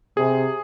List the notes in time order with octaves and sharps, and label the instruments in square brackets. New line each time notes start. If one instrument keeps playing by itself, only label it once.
[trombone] C3 [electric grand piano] G#4